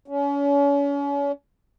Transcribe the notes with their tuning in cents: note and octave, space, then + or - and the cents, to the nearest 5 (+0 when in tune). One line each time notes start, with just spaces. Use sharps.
C#4 +35